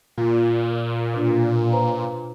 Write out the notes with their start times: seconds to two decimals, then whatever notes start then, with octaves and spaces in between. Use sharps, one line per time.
0.18 A#2 F4
1.14 B2 D4 F4
1.72 B4 C5 A#5